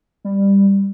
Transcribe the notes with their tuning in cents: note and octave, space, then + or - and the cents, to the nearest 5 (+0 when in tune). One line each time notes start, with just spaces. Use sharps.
G3 +15